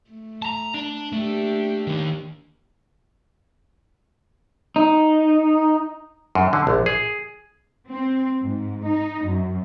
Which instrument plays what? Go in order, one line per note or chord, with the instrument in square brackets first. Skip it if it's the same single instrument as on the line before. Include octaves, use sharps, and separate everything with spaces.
[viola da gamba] A3
[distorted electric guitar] A5 A#5
D4
[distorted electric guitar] A3 [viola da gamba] A#3 D4 G4
[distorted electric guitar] D#3 A#3
[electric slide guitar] D#4
[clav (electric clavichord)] F#2
D3
A#1
G#4
[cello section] C4
G#2
D#4
F#2